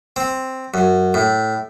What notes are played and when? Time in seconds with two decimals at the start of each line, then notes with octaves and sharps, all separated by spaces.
0.16 C4
0.74 F#2
1.14 A2